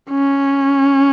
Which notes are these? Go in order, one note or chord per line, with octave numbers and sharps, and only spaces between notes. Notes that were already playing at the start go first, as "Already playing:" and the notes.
C#4